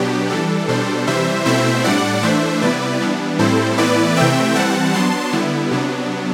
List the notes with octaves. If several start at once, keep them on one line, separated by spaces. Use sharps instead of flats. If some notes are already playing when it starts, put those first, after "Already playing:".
Already playing: B2 F#3 B3 D4 G4
E3 G3 D4 A4
B2 G3 D4 A4 C5
C3 E3 G3 C5 E5
B2 A3 C4 E4 C5 E5
A2 G3 D4 D5 F#5
E3 A3 D4 C5 E5
C3 G3 B3 E4 B4 D5
E3 G3 B3 D4
A2 G3 C4 E4 A4 C5
A2 E3 B3 E4 B4 D5
C3 E3 A3 C4 E5 G5
E3 G3 C4 F#5 A5
F#3 B3 D4 A5 C6
D3 G3 B3 E4
C3 F#3 B3 D4